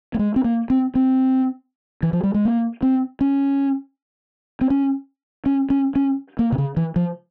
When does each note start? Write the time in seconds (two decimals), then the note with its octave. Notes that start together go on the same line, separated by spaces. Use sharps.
0.14 A#3
0.19 G#3
0.36 C4
0.44 A#3
0.70 C4
0.95 C4
2.03 E3
2.13 F3
2.23 G3
2.34 G#3
2.45 A#3
2.83 C4
3.21 C#4
4.61 C4
4.70 C#4
5.46 C#4
5.70 C#4
5.95 C#4
6.39 A#3
6.52 C3
6.58 C#3
6.77 E3
6.96 F3